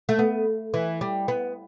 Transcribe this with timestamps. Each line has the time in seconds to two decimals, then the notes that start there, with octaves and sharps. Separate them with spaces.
0.09 A3
0.19 B3
0.74 E3
1.01 G3
1.28 B3